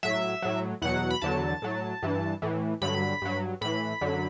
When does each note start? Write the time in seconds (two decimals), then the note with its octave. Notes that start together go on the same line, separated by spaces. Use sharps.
0.03 A2 F#3 E5
0.42 A2 F#3
0.82 E2 B2 F#3 F#5
1.10 B5
1.22 E2 D3 F#3 A5
1.62 A2 F#3
2.02 G2 E3
2.42 A2 E3
2.82 G2 D3 F#3 B5
3.22 G2 F#3
3.61 A2 E3 B5
4.01 F#2 D3 F#3